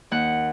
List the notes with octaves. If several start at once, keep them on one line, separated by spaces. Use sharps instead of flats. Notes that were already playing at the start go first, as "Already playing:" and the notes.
D#2 F#5